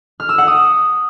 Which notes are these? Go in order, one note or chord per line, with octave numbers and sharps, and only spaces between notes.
F6
E6
F#5
D#6